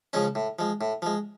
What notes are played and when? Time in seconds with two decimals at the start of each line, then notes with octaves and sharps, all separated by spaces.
0.13 C#3 F3 G#3 C#4
0.35 A2
0.59 F3 G#3
0.81 A2
1.02 F3 G#3